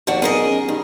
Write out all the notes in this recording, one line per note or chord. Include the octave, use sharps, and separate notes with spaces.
D#2 F3 D4 F#4
B1 G#4 A#4 D#5
F#2
G2 D#3